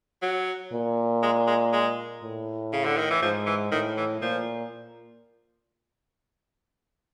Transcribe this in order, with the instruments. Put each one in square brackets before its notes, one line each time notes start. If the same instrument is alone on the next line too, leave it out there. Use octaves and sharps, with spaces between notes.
[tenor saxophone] F#3
[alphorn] A#2
[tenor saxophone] G#3
G#3
G#3
[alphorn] A2
[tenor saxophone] C#3
D3
D#3
E3
[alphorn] G#2 [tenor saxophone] F3
[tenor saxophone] E3
[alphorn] A2 [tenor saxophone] D#3
[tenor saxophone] E3
[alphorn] A#2 [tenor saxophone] F3